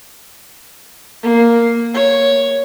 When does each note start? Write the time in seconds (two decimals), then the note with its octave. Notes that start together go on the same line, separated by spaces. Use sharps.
1.23 A#3
1.95 C#5